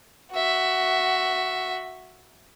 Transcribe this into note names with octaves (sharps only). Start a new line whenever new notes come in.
F#4 E5